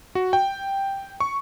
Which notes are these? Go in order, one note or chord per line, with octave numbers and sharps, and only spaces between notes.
F#4
G5
C#6